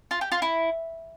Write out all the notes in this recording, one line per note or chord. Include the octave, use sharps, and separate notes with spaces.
F4
G4
F4
E4